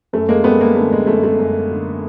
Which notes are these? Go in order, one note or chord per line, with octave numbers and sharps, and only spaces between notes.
F#2 A3
G#3 A#3
G3 A3 B3
G#3 A#3
D3 A3
G#3
F#2 A3
A3
F#2
D3